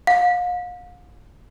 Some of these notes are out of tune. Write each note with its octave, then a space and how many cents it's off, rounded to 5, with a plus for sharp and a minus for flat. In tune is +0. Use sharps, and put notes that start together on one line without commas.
F5 +40